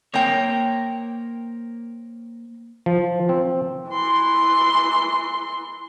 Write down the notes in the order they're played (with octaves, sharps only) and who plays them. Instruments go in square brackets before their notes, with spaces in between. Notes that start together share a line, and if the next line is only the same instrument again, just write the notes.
[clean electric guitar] A#3 A#4 C#5 [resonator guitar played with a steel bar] C4 G5
[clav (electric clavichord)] F3
C4
[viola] E3 C6